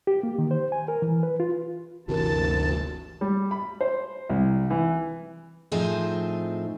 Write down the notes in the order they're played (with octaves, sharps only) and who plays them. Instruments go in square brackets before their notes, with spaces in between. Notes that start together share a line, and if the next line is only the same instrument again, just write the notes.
[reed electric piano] G4
A#3
D#3
C5
G#5
A#4
E3
B4
F4
[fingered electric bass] G1 C3 E3 [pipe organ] D2 A5 [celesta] F#4 G4 A#4
[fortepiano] G3
B5
C5
C2
E3
[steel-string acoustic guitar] A2 F3 C4 D#4 G#4